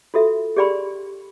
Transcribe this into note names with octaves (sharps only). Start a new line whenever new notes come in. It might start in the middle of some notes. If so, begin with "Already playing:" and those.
F4 F#4 A4 E5
G4 G#4 D5 G5 B5 C6